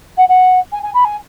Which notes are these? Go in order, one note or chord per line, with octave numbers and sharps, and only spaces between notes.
F#5
F#5
G#5
G#5
B5
G#5